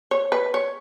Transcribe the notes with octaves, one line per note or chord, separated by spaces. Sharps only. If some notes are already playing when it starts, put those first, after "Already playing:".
C#5
B4
C#5